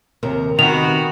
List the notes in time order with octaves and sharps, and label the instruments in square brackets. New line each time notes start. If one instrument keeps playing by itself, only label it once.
[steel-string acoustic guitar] D#2 C3 A#4
[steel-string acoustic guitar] C3 G5 [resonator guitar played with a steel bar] D#3 B3 [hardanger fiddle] F#4 [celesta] F7